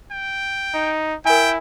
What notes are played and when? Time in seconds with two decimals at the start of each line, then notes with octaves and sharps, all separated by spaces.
0.11 G5
0.74 D#4
1.25 E4 A#4 G5 G#5